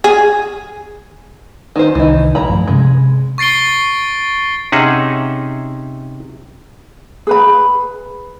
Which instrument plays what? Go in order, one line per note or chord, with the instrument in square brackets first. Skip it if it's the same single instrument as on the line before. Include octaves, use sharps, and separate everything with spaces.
[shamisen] G#4
[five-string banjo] D#3 C5
[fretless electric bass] C2 D#3 [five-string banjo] E3 D#4
[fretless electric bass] A#1 [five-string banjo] E4 A#5 B5
[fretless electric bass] G2 F3 A3
[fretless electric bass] C3 C#4 [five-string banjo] G#3
[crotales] C#6 A6 C7 D7 G7
[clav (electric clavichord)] C3 C#4 D#4 G#4 E5 F#5
[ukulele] G#4 B4 B5